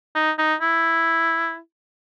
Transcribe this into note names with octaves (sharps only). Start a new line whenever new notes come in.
D#4
D#4
E4